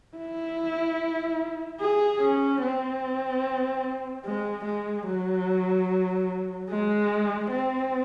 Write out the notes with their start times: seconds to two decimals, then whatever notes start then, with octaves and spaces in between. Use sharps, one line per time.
0.17 E4
1.80 G#4
2.21 C#4
2.62 C4
4.25 G#3
4.65 G#3
5.07 F#3
6.70 G#3
7.51 C4